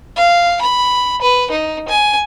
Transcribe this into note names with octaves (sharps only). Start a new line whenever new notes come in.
F5
B5
B4
D#4
G#5